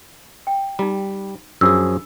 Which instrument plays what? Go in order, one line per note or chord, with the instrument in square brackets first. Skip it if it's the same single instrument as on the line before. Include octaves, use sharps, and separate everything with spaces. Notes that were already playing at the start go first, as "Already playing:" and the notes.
[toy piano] G5
[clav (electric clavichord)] G3 [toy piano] D#4 A#5
[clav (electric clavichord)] F#2 F3 G#4 [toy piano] D4 B5 E6